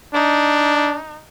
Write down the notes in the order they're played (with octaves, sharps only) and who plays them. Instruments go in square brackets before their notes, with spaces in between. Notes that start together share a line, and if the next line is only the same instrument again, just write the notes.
[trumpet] D4 [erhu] D#4